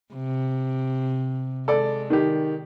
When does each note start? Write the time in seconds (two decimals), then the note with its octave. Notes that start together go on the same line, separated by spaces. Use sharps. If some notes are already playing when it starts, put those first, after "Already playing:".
0.13 C3
1.68 G#3 A4 D5
2.10 D#3 G4